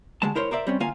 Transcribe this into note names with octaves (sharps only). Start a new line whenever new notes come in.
D2 G#3 A5
E4 A#4 C5 C#5
A#4 C5 D5 E5
G3 C4 C#4
D2 A#3 F4 F5 G#5